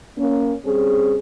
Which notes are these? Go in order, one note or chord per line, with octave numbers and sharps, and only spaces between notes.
A#3 C#4
G3 C4 C#4 G#4